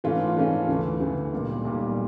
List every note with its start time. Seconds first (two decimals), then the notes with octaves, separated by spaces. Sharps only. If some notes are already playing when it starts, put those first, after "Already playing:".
0.04 G#2 E3 A3 C#4 F4
0.36 G#2 E3 A3 C#4 F4
0.68 D2 C#3 E3
1.00 D2 C#3 E3
1.33 B1 A#2 G3
1.65 B1 A#2 G3